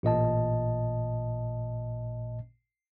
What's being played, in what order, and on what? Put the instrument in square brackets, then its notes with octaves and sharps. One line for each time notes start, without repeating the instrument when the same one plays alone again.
[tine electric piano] A1 A#2 D#5 A5